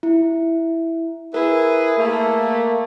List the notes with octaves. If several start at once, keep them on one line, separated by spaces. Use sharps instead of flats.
E4
E4 G#4 A#4 B4
A3 A#3